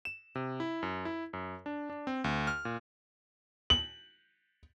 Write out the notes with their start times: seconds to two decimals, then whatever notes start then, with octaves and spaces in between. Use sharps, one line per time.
0.05 E7
0.35 C3
0.60 E4
0.83 F#2
1.05 E4
1.33 F#2
1.66 D4
1.90 D4
2.07 C4
2.24 D2
2.47 F6
2.65 A#2
3.70 F#7